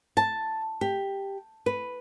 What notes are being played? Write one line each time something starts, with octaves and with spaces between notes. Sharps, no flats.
A5
G4
B4